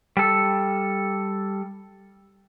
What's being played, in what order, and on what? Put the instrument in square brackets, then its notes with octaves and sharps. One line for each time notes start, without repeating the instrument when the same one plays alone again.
[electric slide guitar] G3 A4